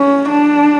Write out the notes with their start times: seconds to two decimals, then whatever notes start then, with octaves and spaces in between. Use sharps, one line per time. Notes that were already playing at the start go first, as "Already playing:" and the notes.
Already playing: C#4
0.29 D4